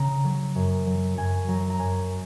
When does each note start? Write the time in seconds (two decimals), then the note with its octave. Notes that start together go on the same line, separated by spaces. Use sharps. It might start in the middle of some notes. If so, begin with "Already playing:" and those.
Already playing: C#3 A#5
0.24 F#3
0.55 F#2
0.86 F#3
1.17 F#2 G#5
1.48 F#3 A#5
1.70 A#5
1.79 F#2 G#5